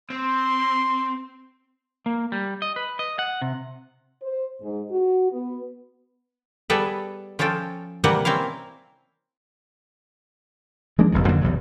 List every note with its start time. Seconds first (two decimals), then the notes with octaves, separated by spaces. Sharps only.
0.10 C4 C6
2.06 A#3
2.32 G3
2.62 D#5
2.76 B4
2.99 D#5
3.19 F#5
3.42 C3
4.22 C5
4.62 G#2
4.91 F#4
5.32 B3
6.70 G3 B3 G#4 A4 B4
7.39 F3 C#4 F4 A4 G5
8.04 C3 E3 G3 A#3 B4 F#5
8.25 A#3 C4 C#4 E4 F5
10.98 F3 G#3 A#3 D4
11.12 F#1 B1 F2 C3
11.29 F2 D3 F#3 A#3
11.41 B1 E2 C3 F#3